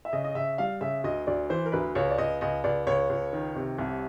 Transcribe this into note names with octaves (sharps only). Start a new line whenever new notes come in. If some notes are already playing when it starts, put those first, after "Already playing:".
E5
C#3 D#5
D#5
C#3 E5
G3 F5
C#3 E5
D2 D#5
D2 D5
E3 C5
A#4
D2 B4
C#2 C#5
D5
C#2 D#5
C#2 D#5
C#2 D5
C#2 C#5
C#2
D#3
C3
C2